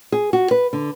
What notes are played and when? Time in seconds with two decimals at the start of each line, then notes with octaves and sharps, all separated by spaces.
0.12 G#4
0.33 F#4
0.51 B4
0.73 D3